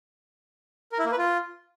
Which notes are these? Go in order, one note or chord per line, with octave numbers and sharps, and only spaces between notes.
A#4
E4
A#3
B4
F4